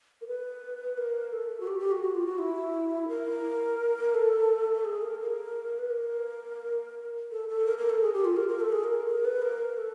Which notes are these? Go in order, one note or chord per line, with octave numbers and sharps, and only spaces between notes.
A#4
B4
A#4
A4
F#4
G4
G4
F#4
F#4
F4
F#4
E4
A#4
A4
G#4
A#4
A#4
B4
A#4
A4
A4
A#4
A#4
A4
G#4
G4
F4
A#4
A#4
A4
G#4
A#4
A#4
B4
A#4
A4